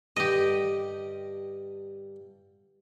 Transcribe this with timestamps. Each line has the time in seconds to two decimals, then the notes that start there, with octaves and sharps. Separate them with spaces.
0.16 G2 D3 G4 D#5